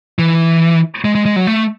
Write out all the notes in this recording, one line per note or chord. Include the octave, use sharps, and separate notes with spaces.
E3
G#3
G#3
G#3
F#3
A3